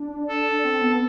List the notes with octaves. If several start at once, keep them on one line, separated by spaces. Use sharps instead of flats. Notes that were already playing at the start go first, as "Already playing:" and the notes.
Already playing: D4
A4
C4
B3
B3